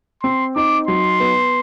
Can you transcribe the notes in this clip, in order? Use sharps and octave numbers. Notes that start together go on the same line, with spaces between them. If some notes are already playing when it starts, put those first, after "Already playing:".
C4 C6
D#4 D6
F#3 C6
B3